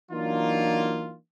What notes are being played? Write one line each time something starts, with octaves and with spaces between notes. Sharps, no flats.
E3 F#3 A#3 D4 D#4 F4